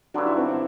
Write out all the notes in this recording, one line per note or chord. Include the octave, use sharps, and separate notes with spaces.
G2 D3 F#3 D4
E4
C4
C4